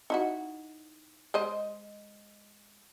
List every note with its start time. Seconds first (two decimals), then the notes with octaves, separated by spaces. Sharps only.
0.10 D#4 E4 F#4
1.34 G#3 C5 D#5